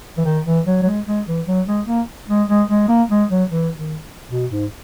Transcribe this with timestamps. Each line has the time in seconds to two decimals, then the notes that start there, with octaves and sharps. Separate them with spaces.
0.18 E3
0.25 D#3
0.46 E3
0.66 F#3
0.82 F#3
0.85 G#3
1.07 G#3
1.27 E3
1.47 F#3
1.67 G#3
1.87 A#3
2.28 G#3
2.49 G#3
2.69 G#3
2.88 A#3
3.10 G#3
3.30 F#3
3.50 E3
3.77 D#3
4.30 B2
4.51 G#2